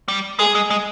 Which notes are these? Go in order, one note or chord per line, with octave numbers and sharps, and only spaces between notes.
G3
G#3 G#4
G#3
G#3